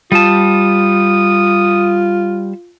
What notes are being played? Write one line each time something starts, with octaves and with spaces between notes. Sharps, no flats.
G3 F4 A5 D#6